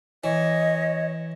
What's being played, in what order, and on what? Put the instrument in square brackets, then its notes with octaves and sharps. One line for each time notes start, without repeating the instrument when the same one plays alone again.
[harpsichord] E3 [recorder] C#5 [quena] D#5